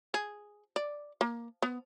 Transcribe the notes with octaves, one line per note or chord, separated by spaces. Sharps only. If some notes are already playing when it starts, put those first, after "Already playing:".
G#4
D5
A#3
B3